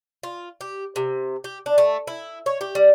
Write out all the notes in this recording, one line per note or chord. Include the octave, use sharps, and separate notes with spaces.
F4
G4
C3
G4
D4
A3
E4
C#5
G4
G3